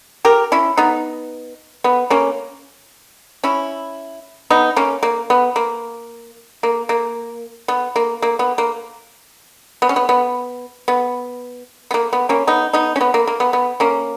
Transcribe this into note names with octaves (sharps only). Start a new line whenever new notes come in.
G4 A#4
C#4 E4
B3 D#4
B3
A#3 C#4
C#4 E4
B3 D#4
A#3 C#4
A#3
B3
A#3
A#3
A#3
B3
A#3
A#3
B3
A#3
B3
C#4
B3
B3
B3
B3
A#3
B3
A#3 C#4
B3 D#4
B3 D#4
C#4
B3
A#3
A#3
B3
B3
A#3 C#4